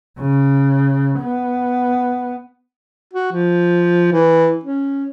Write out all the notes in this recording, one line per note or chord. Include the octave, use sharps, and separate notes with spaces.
C#3
B3
F#4
F3
E3
C#4